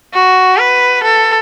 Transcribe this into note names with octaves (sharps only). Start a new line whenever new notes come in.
F#4
B4
A4